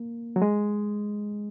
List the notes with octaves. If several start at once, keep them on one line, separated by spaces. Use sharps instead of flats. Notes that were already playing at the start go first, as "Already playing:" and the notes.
Already playing: A#3
F#3
G#3